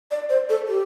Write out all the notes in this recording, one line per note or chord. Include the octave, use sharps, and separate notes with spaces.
D5
C5
A4
G4